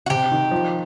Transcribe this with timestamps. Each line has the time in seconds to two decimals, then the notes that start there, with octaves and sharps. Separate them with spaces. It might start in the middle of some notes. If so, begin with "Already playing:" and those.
0.06 F#4
0.10 C3 G4
0.32 D#3
0.51 F3